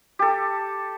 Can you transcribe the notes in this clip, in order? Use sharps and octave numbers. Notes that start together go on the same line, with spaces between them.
G4 A4